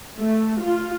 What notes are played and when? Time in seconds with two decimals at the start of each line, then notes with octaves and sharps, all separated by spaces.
0.18 A3
0.61 F4